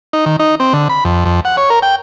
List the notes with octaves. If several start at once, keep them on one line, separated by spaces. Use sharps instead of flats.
D#4
D#3
D#4
C4
D3
B5
F2
F2
F#5
C#5
A#4
G5